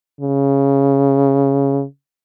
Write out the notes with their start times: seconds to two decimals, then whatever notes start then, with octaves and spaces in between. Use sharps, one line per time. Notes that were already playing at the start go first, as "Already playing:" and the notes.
0.21 C#3